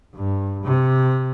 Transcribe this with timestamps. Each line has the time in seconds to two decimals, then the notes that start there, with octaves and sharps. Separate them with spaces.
0.15 G2
0.64 C3